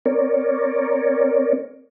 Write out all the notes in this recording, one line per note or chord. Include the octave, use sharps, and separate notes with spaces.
C4 A#4 C#5 D5